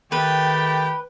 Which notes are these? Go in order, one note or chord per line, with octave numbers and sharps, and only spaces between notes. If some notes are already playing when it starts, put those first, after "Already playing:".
D#3 A3 G4 B4 G5